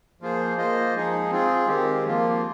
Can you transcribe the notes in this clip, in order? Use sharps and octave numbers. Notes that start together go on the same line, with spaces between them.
F3 A#3 F4 G#4 C5
A#3 F4 C5 D#5
F3 G#3 D#4 G#4
C4 F4 G#4
D#3 G#3 C4 G4
F3 A#3 F4